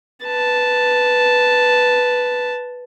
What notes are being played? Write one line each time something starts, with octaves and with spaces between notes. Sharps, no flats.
B4 A5